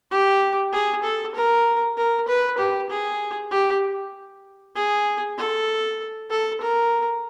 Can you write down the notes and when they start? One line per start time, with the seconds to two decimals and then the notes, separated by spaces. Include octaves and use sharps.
0.11 G4
0.73 G#4
1.04 A4
1.35 A#4
1.97 A#4
2.28 B4
2.58 G4
2.90 G#4
3.51 G4
4.76 G#4
5.38 A4
6.31 A4
6.61 A#4